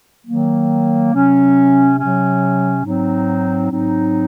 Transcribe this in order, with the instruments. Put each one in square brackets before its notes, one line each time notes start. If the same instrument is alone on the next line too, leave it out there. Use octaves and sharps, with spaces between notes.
[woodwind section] D#3 F#3 A#3
C3 F#3 C#4
C3 F#3 C#4
G#2 F#3 C4 D#4
G#2 F#3 C4 D#4